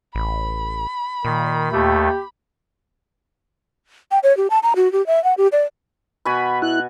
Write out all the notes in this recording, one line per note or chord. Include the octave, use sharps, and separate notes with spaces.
A1 B5
A#2 D#3
D#2 A3 G4
G5
C#5
G4
A5
A#5
F#4
G4
E5
F#5
G4
D5
B2 F#4 G#5 B5
E4 F#6